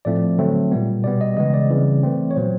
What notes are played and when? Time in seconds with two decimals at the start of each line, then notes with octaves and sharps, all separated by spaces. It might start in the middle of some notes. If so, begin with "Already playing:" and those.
0.05 A2 F3 A3 C4 D5
0.39 D3 F#3 A3 C4
0.72 A#2 G3 B3
1.04 B2 G3 B3 D5
1.21 D#5
1.37 C#3 E3 G#3 B3 D#5
1.54 D5
1.70 C#3 E3 G3 C4
2.03 E3 A3 C4
2.31 C#5
2.36 A#2 F#3 B3 C5